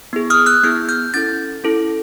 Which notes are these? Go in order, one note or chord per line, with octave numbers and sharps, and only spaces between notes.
B3 E4 G#4
D#6 F6
E6 F#6
B3 E4 G#4 F6 G6
F6 G6
C#4 E4 A4 G6 A6
C#4 E4 A4